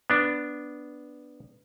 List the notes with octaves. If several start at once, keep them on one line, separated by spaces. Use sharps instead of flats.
B3 D4